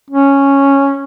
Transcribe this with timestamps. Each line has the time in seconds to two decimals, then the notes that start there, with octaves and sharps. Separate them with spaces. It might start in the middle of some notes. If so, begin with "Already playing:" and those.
0.10 C#4